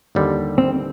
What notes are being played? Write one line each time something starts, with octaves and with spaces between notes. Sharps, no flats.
D#2 D3 G3
C4